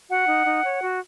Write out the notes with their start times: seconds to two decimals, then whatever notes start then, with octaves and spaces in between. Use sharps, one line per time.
0.10 F#4 F#5
0.28 D#4
0.46 D#4
0.65 C#5
0.83 F#4